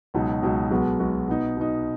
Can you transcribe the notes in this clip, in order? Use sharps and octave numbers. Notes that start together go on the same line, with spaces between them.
C#2 B2 F#3 D#4
C#2 B2 F#3 D#4
B1 B2 G#3 B3 F#4
B1 B2 G#3 B3 F#4
B2 B3 D#4
B2 B3 D#4